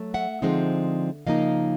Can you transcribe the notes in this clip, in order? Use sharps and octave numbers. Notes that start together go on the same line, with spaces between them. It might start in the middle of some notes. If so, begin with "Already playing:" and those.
Already playing: F#3 A3
E5 F#5
D3 F3 G#3 C4 D#4
C#3 F3 A#3 D#4 D#5 F5